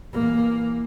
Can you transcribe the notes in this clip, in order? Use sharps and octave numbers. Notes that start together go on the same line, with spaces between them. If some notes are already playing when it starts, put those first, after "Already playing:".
E3 A#3